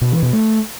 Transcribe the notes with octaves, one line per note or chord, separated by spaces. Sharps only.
B2
E3
B2
A3